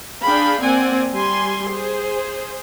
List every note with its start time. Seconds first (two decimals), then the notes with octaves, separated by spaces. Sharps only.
0.23 D4 G#4 F5 G5 B5
0.61 A#3 C4 D5 F#5 G#5
1.13 G3 G#5 C6
1.69 G#4 C5